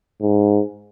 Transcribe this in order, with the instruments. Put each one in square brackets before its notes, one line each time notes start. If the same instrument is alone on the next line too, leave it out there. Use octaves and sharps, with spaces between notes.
[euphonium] G#2